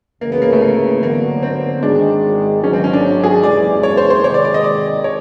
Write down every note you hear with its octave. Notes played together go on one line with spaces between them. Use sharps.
C#2 C#3 E3 A#3
B3
A#3
A3
A#3
D3 F#3 A#3 B3
C4
G#1 G#2 D#3 G#3 D4
G#1 G#2 D#3 F#3 C#4
C4
C#4
D4
G#4
F#1 E2 C3 E3 G#3 D5
C#5
C5
C5
C3 D#3 G#3 C#5
D5
D5
D#5
D5
C#5